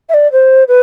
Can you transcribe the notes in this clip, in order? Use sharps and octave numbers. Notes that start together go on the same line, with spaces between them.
E5
D5
C5
B4